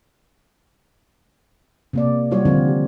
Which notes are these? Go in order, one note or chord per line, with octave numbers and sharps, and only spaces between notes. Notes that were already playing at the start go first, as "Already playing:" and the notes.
C3 A#3 D5
F#3 G3 F4 F#4 C#5
D3 D#3 F3 C4 D4
G4